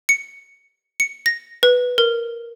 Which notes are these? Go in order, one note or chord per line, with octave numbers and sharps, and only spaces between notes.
C#7
C#7
A#6
B4
A#4